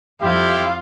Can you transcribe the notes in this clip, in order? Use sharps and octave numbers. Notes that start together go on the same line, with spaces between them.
F2 F3 G3 E4 F4 G4